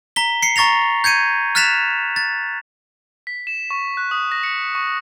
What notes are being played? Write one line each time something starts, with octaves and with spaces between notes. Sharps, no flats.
A#5 B6 G7
C7 C#7
A#5 C#6 A6 A#6 F7
G6 G#6 C#7 D#7
F6 F#6 A6 B6 E7 F7
A6
B6
E7
C#6
F#6
D#6
A#6
C#7
C#6